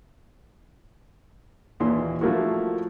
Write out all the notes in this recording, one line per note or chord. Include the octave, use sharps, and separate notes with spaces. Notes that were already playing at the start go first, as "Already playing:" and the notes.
D#2 A#2 E3 C6
F3 F#3 A3 A#3 E4 F#4